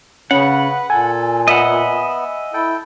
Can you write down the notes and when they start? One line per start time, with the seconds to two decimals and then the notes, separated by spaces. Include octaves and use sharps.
0.31 C#3 C#4 B4 F#5
0.90 A#2 A4 G#5
1.48 B3 D#5 E5 F#5
2.54 E4 A4 G5